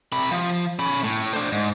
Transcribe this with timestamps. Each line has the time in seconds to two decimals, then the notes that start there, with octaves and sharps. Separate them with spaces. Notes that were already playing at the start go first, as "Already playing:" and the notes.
0.12 C3 B5
0.31 F3
0.79 C#4 B5
1.04 A2
1.33 D4 C5
1.52 G#2